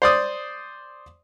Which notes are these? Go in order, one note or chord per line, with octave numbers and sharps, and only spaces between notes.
C5 D5 D#6